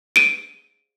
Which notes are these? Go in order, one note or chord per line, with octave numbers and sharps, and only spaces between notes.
D7 D#7